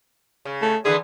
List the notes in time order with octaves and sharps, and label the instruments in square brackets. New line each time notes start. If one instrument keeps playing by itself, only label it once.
[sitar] C#3
[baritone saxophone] A3
[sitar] D3 E3 B3 [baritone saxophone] G#4